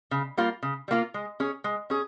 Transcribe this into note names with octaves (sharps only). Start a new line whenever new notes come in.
C#3
G3 A#3 F4
C#3
G3
A#3 F4
G#3
C#4 G#4 C#5
G#3
C#4 G#4